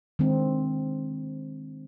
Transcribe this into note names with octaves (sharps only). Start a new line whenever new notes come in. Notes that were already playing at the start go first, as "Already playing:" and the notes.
D#3 G#3 C4 D4